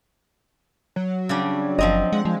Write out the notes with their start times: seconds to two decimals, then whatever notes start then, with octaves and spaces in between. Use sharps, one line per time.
0.96 F#3
1.29 C#3 G3 D4
1.79 F#1 F3 C4 D#5 A#5
2.13 G#3 F#5
2.25 F3 G#3